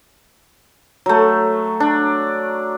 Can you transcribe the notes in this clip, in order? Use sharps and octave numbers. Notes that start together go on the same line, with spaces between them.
F#3 A3
D4